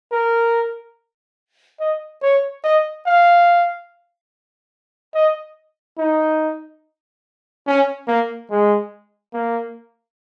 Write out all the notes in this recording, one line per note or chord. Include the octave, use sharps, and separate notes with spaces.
A#4
D#5
C#5
D#5
F5
D#5
D#4
C#4
A#3
G#3
A#3